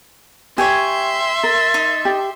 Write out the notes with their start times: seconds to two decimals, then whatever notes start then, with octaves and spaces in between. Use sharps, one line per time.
0.58 G4 C#5 E5 G5 G#5 C6
1.43 A#4 A6
1.74 D#4
2.05 G4